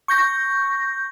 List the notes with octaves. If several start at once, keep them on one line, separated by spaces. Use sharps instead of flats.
C#6 G6 A#6